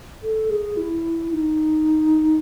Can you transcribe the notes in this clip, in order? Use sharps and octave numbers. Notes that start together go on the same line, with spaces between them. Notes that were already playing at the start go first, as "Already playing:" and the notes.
A4
G#4
E4
D#4